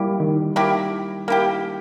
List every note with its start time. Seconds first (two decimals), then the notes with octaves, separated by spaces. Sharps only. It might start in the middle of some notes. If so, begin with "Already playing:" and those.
Already playing: G3 A#3 E4 G4
0.20 D#3
0.56 A#3 E4 G4
1.28 A#3 E4 G4